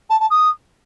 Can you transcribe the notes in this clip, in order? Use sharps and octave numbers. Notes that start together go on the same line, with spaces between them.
A5
A5
D#6